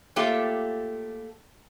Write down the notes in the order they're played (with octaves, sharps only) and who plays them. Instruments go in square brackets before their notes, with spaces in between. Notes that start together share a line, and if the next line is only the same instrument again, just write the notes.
[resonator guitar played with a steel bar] A3 A#3 F4 G4 A4 C#5